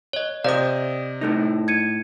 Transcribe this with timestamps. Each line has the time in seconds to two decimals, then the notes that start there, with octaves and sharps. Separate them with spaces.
0.13 C#5 D#5 G7
0.44 C3 C5 D5 D#5 F5 D#6
1.21 A2 A3 D#4
1.68 G#6 C#7 D#7